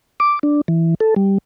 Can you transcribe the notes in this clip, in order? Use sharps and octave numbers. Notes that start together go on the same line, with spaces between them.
D6
D4
E3
A4
G3